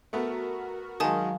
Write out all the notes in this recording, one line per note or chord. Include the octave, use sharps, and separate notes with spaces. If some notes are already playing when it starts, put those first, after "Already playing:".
A3 B3 F#4 A#4
D#3 F#3 G#3 F5 G#5 A5 D#6